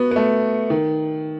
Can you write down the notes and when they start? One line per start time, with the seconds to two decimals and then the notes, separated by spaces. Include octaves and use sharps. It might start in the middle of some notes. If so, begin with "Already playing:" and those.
Already playing: B3 F#4
0.11 B3
0.16 A3
0.70 D#3